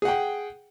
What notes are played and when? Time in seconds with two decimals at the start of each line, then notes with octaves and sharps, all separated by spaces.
0.02 G#4
0.05 F#5
0.08 G5